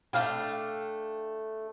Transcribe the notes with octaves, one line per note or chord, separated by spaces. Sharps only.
A3 D4 F5 G5